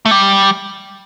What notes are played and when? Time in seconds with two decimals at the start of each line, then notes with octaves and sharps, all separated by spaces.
0.06 A3
0.11 G3